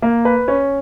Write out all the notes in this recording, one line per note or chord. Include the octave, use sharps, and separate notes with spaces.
A#3
B4
C#4